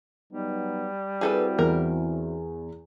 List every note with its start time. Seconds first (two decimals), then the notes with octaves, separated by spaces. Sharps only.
0.33 F#3 G3 B3 D#4
1.21 C4 E4 F#4 G#4 A4 B4
1.59 E2 A#4